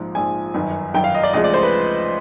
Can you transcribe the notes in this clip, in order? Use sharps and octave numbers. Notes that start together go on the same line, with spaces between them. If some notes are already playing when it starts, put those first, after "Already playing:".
Already playing: A#1 G#2 F3
A#1 G#2 F3 G#5
G1 F#2 D#3
G1 F#2 D#3 G5
F5
D#5
D5
D2 C#3 F3 G#3 D#5
D5
C5
B4